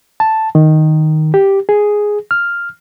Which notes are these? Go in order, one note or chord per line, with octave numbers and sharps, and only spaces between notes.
A5
D#3
G4
G#4
F6